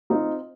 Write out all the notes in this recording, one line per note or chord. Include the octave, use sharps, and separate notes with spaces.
C4 D#4 F4